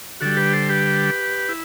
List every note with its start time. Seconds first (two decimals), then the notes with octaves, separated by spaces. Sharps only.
0.21 D3 G3 F#4 A4
0.37 G4 B4
0.53 A4 C5
0.69 G4 B4
1.49 E4